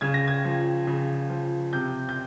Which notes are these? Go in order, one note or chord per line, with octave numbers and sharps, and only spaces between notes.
C#3 G#6
A#6
G#6
F3
C#3
F3
C3 G6
G6